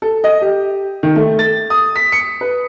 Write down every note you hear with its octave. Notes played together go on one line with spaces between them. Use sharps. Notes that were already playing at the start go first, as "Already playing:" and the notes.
A4
D#5
G4
D#3
A3
A6
D#6
B6
C#7
B4